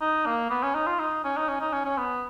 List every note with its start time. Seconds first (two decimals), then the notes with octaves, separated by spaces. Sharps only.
0.01 D#4
0.26 A#3
0.50 B3
0.63 C#4
0.75 D#4
0.87 F4
1.00 D#4
1.24 C#4
1.37 D#4
1.49 C#4
1.61 D#4
1.73 C#4
1.85 C#4
1.98 B3